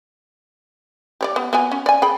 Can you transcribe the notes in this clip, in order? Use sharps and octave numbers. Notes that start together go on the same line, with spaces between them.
G4 C#5 D5
B3
B3 F#4 G#5
C#4
D5 G#5
G#4 G5 B5